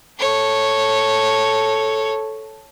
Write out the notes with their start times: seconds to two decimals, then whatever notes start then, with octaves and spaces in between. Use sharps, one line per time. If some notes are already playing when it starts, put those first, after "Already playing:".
0.19 A4 C#5